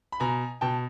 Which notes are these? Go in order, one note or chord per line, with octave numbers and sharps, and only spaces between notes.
B5
B2 G#5 A#5
B2 G5 A5